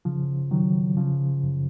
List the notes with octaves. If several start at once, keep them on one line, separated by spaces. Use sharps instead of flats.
C#3 F3
D#3 F#3
C#3 F3
F#2